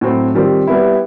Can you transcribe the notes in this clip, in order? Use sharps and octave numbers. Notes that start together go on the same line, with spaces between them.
A2 F#3 A3 C4
D#3 G3 C4 F4
G3 B3 E4